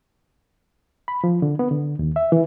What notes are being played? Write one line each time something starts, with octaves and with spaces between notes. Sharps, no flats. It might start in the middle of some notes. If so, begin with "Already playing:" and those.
B5
F3
D3
B3
D3
D#2
E5
E3